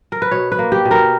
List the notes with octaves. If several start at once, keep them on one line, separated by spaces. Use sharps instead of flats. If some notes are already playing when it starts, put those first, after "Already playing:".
A#4
B4
B2 C#5
B4
A#3
G4
B2
A#4